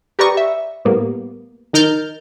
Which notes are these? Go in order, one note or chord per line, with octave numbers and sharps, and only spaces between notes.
G4 A#4 B4 D5 C#6 D#6
E5
A2 G3 A#3 B3
D#3 D#4 A#4 F6 G6 A6